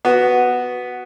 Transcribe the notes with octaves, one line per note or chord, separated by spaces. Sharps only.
B3 F#4